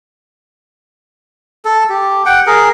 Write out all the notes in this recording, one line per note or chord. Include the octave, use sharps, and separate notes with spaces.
A4
G4
F#5 G5
G#4 A#4